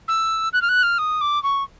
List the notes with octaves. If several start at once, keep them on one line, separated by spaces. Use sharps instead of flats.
E6
F#6
F6
F#6
F6
D#6
D6
C#6